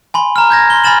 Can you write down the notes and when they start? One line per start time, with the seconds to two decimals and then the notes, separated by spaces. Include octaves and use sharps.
0.14 G#5 B5 C6
0.36 A#5 F6
0.50 G6 G#6 A#6
0.70 C6 G7
0.84 G#5 B5 F6 A6 E7 F#7